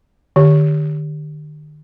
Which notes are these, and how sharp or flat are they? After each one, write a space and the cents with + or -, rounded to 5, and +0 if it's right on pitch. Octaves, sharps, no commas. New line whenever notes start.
D#3 -45 G4 +0